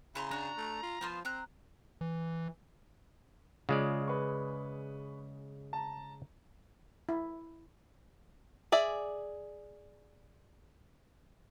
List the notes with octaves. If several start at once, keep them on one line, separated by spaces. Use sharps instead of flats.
C#3 E4 A#5 C6
D4 F#4 A#5
A3
F4
F3 B3 F4 C5
C4 A#5 F#6
E3
C#3 G#3 F4 D5
B4 C#6
A5 A#5
E4
G#4 D5 E5